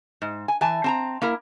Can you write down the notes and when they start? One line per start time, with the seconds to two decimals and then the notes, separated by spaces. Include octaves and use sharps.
0.22 G#2
0.48 G#5
0.61 E3 G#5 A5
0.84 C4 A5 A#5
1.22 A#3 E4 A#4